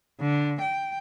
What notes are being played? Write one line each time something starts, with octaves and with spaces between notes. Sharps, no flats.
D3
G5